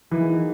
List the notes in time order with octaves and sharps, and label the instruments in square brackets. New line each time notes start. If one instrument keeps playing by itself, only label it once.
[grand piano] E3 [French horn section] F#3 A#3 D#4 G#4